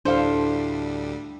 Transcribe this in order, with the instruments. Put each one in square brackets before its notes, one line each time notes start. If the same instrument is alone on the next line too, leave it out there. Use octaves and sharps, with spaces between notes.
[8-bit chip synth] D2 G3 [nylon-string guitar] A2 E4 A4 [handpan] D4 F5 [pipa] C5